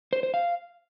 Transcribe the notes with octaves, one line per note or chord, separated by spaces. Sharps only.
C5
C5
F5